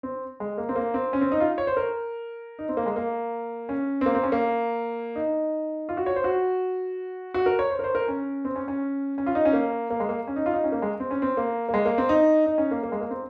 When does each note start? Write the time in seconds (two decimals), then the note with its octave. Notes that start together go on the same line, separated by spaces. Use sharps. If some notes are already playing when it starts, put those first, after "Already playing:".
0.03 C4
0.40 G#3
0.58 A#3
0.69 C4
0.76 A#3
0.94 C4
1.13 C#4
1.21 C4
1.32 D#4
1.40 F4
1.58 C#5
1.67 C5
1.77 A#4
2.59 D#4
2.69 C4
2.77 A#3
2.86 G#3
2.96 A#3
3.69 C#4
4.01 C4
4.06 A#3
4.15 C4
4.23 C#4
4.32 A#3
5.16 D#4
5.89 F4
5.97 F#4
6.06 C#5
6.16 C5
6.24 F#4
7.34 F#4
7.46 A#4
7.59 C#5
7.70 C5
7.79 A#4
7.84 C5
7.95 A#4
8.08 C#4
8.45 C4
8.56 C#4
8.68 C#4
9.18 C#4
9.26 F4
9.35 D#4
9.45 C#4
9.53 A#3
9.90 A#3
10.00 G#3
10.09 A#3
10.28 C#4
10.36 D#4
10.46 F4
10.54 D#4
10.64 C#4
10.72 A#3
10.82 G#3
11.00 C4
11.11 C#4
11.22 C4
11.37 A#3
11.69 A#3
11.74 G#3
11.85 A#3
11.98 C4
12.09 D#4
12.46 D#4
12.58 C#4
12.71 A#3
12.83 A#3
12.92 G#3
13.01 A#3
13.10 C4